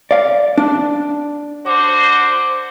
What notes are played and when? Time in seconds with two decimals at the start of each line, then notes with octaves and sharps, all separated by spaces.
0.11 D5 F5
0.58 D4
1.66 D3 F#4 C5 D6